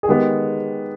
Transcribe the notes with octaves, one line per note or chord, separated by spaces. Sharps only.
G#4
D#3 G#3 B3 G4